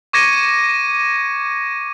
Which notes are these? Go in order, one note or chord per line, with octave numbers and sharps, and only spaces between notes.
C#6 D6 G#6 A#6 C#7 D#7